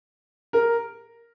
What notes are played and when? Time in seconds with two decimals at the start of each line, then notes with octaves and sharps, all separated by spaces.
0.53 A#4